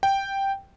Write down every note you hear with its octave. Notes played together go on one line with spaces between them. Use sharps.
G5